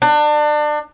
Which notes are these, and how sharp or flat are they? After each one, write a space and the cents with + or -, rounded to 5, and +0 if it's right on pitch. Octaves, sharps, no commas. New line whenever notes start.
D4 +30